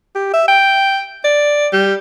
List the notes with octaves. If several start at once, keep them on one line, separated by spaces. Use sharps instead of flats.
G4
E5
G5
D5
G3